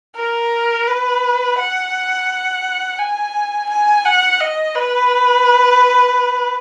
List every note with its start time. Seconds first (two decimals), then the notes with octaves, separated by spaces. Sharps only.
0.16 A#4
0.87 B4
1.58 F#5
2.99 G#5
3.69 G#5
4.06 F#5
4.40 D#5
4.76 B4